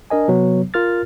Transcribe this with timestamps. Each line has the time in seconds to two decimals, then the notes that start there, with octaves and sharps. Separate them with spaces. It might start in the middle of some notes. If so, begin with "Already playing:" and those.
0.10 D4 A#4 D#5 G#5
0.28 C3 F#3 B3
0.74 F4 A#4 F6 A6